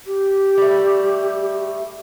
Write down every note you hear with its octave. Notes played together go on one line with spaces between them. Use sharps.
G4
G3 A3